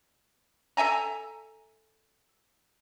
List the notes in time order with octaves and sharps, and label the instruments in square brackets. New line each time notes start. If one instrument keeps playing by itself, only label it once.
[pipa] A4 E5 G#5 A#5